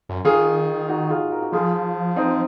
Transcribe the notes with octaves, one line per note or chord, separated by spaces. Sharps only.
F#2
D#3 F4 G#4
D#4 F#4
F4 G#4
F#4 A#4
F#4
F3 F4 G#4
C4 D#4